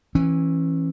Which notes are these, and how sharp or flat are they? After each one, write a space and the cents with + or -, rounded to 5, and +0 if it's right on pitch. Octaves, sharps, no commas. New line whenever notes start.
E3 +0 C#4 -30